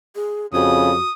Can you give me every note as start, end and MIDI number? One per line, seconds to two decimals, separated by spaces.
0.15 0.46 68
0.54 0.97 41
0.54 0.92 49
0.54 1.05 66
0.54 1.13 87